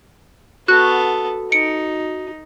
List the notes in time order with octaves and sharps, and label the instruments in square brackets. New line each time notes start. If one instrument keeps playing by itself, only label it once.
[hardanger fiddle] B3 A4 [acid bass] F#4 [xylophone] F#6
[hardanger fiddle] D#4 [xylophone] C#7 D7